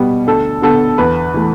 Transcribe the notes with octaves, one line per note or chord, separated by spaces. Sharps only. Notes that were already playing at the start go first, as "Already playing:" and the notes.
Already playing: B2 G3 B3
D2 A4
D3 B3 A4
E2 B4
E3 A3